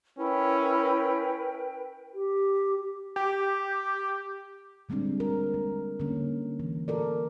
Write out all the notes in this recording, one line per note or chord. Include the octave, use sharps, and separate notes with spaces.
C#4 E4 A#4 B4 G5
G4
G4
D3 G3 G#3 C4 D4
A#4
G#3
D3 A#3 C#4
E3
A4 A#4 D5